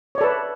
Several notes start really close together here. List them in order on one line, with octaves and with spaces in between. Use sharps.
C#5 D5 A4 B4